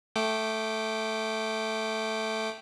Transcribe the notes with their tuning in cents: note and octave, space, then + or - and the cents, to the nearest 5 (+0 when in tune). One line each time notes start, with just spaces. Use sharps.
A3 +0 G5 -15 D6 +10